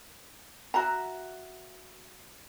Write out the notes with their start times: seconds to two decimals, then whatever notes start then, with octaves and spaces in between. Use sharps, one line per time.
0.74 F#4 E5 A#5